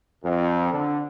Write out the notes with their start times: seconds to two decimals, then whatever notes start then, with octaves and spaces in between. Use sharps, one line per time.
0.24 F2
0.72 D3